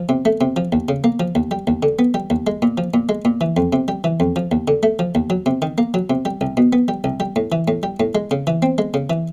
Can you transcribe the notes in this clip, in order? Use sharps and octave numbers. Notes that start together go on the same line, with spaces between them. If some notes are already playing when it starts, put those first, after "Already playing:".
Already playing: F3
C3
A3
C3
F3
D#2
C#3
A#3
F3
D#2
G3
D#2
D3
B3
G3
D#2
G#3
A#2
F3
A#2
G#3
A#2
E3
F2
C3
G3
E3
F2
F3
D#2
D3
A3
F3
D#2
F#3
C3
D#3
A#3
F#3
C3
G3
C2
B2
B3
G3
C2
G3
A2
E3
A2
G3
A2
G#3
C#3
E3
C4
G#3
C#3
E3